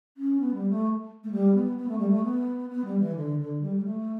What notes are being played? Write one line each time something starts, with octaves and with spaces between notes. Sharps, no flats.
C#4
B3
G3
A3
A3
G3
B3
B3
A3
G3
A3
B3
B3
G3
E3
D3
D3
G3
G3
A3